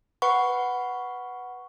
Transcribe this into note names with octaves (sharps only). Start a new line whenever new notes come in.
B4 F#5 B5 C#6